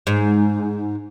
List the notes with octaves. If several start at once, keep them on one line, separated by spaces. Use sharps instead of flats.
G#2